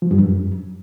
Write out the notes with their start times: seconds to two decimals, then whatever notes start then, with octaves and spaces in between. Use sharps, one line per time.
0.02 F3
0.11 G2
0.20 F#2